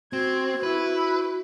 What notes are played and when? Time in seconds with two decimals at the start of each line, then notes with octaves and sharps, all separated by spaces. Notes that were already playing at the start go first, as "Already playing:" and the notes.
0.13 C4 F#4 G#6
0.63 E4 B4